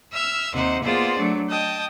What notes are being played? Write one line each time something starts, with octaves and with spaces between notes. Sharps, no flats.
E5 E6 F6
D#2 C3 D#4 C5 F#5
A#3 B3 F4 G#4 C5 D5
F#3 A3 D4
D#5 G5 A5 D#6